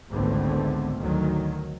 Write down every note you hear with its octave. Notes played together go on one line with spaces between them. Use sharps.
G#1 C#2 D3 A3 B3 C4
D2 D#3 F#3